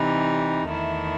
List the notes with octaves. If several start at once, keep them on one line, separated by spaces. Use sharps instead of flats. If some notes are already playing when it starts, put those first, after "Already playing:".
Already playing: C3 E3 G3 D#4
E2 D#3 A3 E4